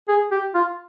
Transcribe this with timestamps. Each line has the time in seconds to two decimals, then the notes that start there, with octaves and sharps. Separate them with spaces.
0.08 G#4
0.31 G4
0.55 F4